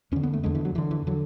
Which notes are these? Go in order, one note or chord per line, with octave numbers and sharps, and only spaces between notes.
E2 D3 C#4
B3
A3
E2 D3 G#3
E3
F#3
E2 D3 E3
E3
D3 F#3